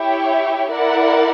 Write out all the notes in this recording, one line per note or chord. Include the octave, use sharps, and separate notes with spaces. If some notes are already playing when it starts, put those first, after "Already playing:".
Already playing: E4 G4 C#5 E5 G5
E4 A#4 D5 F#5